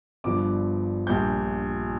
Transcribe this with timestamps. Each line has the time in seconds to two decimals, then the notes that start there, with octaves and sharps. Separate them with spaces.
0.24 G1 G2 F3 D6
1.07 A#1 A#2 G3 G6